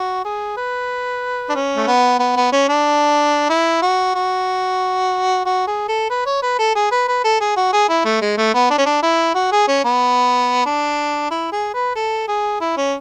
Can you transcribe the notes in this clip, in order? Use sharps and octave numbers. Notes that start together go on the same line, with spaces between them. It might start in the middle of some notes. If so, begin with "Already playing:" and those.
Already playing: F#4
G#4
B4
D4
C#4
A3
B3
B3
B3
C#4
D4
E4
F#4
F#4
F#4
G#4
A4
B4
C#5
B4
A4
G#4
B4
B4
A4
G#4
F#4
G#4
E4
A3
G#3
A3
B3
D4
C#4
D4
E4
F#4
G#4
C#4
B3
D4
E4
G#4
B4
A4
G#4
E4
C#4